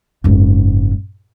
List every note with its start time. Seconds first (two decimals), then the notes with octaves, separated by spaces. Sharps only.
0.24 F#1 G#2